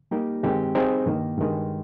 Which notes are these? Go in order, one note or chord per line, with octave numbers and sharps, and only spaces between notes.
G3 A#3 D#4 G4
G2 D#3 G#3 C4 G4
G3 C4 D#4 G#4 C5
G2 D#3 A#3
G2 D#3 G#3